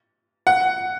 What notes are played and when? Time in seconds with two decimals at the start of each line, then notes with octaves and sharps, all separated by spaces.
0.47 F#5